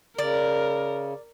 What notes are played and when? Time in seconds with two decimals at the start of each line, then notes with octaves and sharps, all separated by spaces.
0.19 C#3 A#4 D5